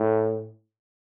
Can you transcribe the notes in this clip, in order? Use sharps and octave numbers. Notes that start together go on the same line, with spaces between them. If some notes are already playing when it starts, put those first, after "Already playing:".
Already playing: A2